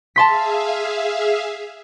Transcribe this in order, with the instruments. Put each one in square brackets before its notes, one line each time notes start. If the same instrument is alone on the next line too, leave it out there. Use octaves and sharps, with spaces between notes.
[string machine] G#4 E5 F5 [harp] A5 C6 B6